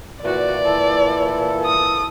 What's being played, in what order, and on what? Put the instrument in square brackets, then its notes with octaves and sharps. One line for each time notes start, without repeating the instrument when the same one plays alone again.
[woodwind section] A#2 E3 [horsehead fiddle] F#4 [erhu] D5
[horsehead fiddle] E4 A4
[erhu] D#6